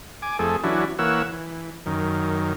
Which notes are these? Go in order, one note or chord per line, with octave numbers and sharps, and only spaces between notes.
G#5 D6
F2 A3 G#4 A4
E3 F#3 C#4 D4 E4 F#4
E3 A#3 C#5 F#5 E6
E3
F#2 D#3